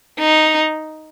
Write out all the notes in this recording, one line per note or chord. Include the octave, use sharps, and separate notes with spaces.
D#4